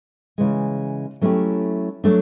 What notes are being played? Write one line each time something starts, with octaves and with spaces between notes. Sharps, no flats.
C#3 E3 G#3
F#3 A3 C#4 E4 G4
F#3 A3 D4